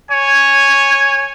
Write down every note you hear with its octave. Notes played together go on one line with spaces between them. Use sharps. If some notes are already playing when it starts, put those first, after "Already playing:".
C#5 G#5